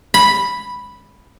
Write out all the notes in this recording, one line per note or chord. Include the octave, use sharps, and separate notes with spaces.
B5